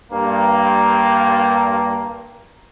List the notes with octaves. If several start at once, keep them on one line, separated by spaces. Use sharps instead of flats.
G2 A#3